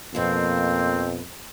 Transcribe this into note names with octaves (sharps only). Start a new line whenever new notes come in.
F2 B2 F3 A#3 C4